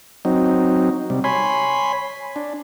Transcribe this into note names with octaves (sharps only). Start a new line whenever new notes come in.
F#3 C4 D#4
C3 G3
C#5 G#5 B5 C6
D4